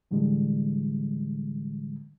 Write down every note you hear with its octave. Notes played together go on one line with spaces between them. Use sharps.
A2 D3 E3 G3 G#3